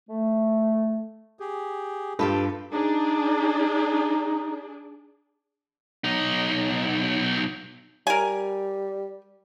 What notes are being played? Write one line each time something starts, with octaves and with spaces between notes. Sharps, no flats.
A3
G4 G#4
G2 F4 G4 A4 B4
D4 D#4 G#4
B1 D#4
G3 A#4 G#5